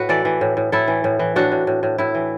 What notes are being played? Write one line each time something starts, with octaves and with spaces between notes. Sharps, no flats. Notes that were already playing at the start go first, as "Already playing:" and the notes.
Already playing: A2 F#4 B4
E3 A4 D5
E3
A2
A2
A2 E4 A4
E3
A2
E3
A2 D4 F#4
A2
A2
A2
A2 E4
E3